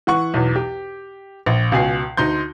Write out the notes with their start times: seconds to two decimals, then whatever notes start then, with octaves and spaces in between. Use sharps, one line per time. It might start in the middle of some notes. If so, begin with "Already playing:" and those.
0.07 E3 F#5 C#6
0.34 B1 E2
0.56 G4
1.46 A#1
1.72 C#2 B2 G#5 C7
2.17 D2 D#4 C6 G6